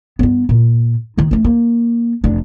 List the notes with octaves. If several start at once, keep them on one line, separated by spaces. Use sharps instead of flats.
G2 B3
A#2
D#3 G#3
A3 C#4
A#3
F1 D4